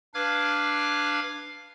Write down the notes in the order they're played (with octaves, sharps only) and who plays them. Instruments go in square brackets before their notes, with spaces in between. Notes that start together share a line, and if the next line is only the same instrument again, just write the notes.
[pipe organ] D4 B4 F5 D6 F6 G#6